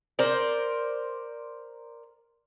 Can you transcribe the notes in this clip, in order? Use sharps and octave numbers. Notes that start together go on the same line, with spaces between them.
A#4 C5 D5